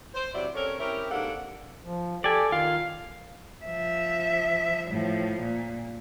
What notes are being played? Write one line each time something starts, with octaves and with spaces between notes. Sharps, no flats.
C5
C3 F#3 E4 D5
C4 C#4 A4 A#4 C#5
C4 C#4 E4 G4 A#4
G#2 C3 A#3 D4 A4 F#5
F3
G4 A4 D5 G#5
D#3 F4 F5
F3 E5
A2 F3
A#2